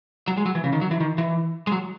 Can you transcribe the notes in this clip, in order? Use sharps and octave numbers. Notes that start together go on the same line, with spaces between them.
F#3
G#3
F#3
E3
C#3
D#3
F#3
E3
D#3
E3
G#3
F#3